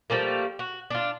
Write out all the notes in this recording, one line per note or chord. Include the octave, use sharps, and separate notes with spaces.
F3 G3 A3 A#3
F#4
D4 F4